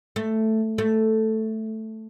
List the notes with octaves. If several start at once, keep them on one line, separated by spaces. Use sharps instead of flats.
A3
A3